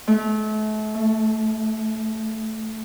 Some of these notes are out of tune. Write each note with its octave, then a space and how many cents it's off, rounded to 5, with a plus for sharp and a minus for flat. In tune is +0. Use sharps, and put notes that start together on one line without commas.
A3 -35
A3 +5